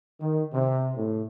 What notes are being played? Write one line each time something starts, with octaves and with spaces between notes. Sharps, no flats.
D#3
C3
A2